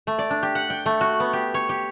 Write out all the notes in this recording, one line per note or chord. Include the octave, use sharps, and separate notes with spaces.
A3
D5
D4
G4
F#5
G5
A3
F#4
B3
G4
C#5
G4